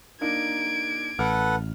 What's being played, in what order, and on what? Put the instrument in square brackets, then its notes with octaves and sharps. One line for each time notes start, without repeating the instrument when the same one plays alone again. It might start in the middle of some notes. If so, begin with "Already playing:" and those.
[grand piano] A#3 D4 D#4 [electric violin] G#6 D7
[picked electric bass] A1 [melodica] A4 B4 F#5 [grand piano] F6